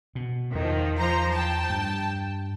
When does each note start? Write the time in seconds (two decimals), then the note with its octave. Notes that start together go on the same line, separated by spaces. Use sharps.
0.15 B2
0.54 E2 D#3 F3
0.97 F3 C5 A#5
1.32 G5 A5
1.70 G2